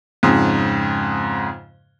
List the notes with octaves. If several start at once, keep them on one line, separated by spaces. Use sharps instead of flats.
F2 G#2 C#3